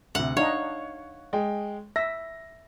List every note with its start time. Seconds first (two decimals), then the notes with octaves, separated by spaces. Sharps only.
0.15 D2 C3 F#5
0.37 D4 D#4 C#5 F5 F#5
1.33 G#3 G5
1.96 E5 A#6